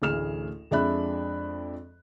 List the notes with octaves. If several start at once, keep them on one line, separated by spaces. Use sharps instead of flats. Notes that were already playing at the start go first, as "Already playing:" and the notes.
A1 D2 G#4 F6 E7
F2 G#3 D4 E5 B5 F#6